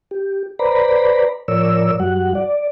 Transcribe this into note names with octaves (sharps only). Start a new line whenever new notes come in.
G4
B4 C5 D5 A#5 B5
A2 F3 A#4 C#5 D5 E6
F#2 F#3 G3 F#4 F#5
D5